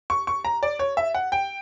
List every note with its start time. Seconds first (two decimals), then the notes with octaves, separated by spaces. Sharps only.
0.10 C#6
0.27 C#6
0.45 A#5
0.63 D5
0.79 C#5
0.97 E5
1.15 F#5
1.32 G5